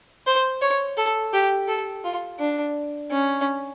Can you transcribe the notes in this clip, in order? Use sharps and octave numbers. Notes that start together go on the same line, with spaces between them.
C5
C#5
A4
G4
A4
F4
D4
C#4